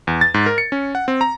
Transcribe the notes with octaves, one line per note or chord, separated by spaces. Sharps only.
E2
A6
G#2
A#4
C#7
C#4
F#5
C4
A#5